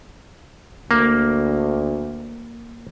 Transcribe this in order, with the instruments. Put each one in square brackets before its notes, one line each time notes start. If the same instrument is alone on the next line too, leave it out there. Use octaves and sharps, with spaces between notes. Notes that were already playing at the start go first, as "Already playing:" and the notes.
[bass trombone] D2 [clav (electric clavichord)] A#3